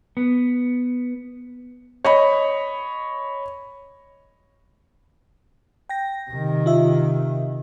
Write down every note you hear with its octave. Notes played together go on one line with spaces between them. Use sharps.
B3
C#5 D#5 B5
G5 A#6
C3 D#3
F4 E5